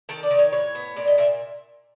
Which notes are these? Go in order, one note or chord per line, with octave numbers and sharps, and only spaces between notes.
D#3 A4
D5
D#3
C#5
A2 C#5
B3
A#2 D5
D#5
A#2 E5